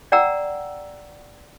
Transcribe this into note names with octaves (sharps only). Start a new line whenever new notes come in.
D5 F#5 G5 A#5 E6